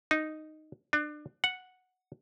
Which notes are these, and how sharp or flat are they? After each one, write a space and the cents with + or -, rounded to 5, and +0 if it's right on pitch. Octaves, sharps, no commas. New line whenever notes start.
D#4 -5
D4 +30
F#5 -5